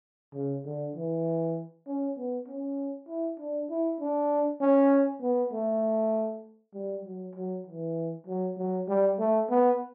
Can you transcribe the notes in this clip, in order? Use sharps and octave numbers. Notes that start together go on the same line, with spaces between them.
C#3
D3
E3
C#4
B3
C#4
E4
D4
E4
D4
C#4
B3
A3
G3
F#3
F#3
E3
F#3
F#3
G3
A3
B3